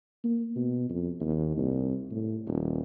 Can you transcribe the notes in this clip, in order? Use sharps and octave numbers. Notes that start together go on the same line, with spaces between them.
A#3
B2
F2
D#2
C2
A2
D#1